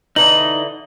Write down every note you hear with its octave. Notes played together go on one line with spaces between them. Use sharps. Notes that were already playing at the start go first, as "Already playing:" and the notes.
D3 E3 D#4 D#5 A#5 F#7